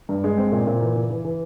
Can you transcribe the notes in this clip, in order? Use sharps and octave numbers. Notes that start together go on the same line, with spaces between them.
G2
G#3
C4
A#2
A#2
E3
E3
E3
E3